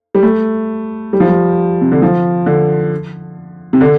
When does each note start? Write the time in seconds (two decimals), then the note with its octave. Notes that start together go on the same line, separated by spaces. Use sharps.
0.15 G3
0.23 A3
1.13 G3
1.20 F3
1.28 G3
1.81 C3
1.92 D3
2.02 F3
2.46 D3
3.73 C3
3.81 D3